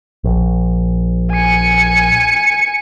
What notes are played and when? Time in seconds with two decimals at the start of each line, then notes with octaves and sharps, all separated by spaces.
0.24 A#1
1.33 G#5 C#7